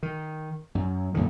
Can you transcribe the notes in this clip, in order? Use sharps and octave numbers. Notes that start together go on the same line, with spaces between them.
D#3
F#2
F#2 A#2 D3 D#3